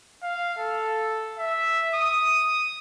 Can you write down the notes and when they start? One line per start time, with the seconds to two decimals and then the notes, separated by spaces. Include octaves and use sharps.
0.23 F5
0.58 A4
1.38 E5
1.95 D#6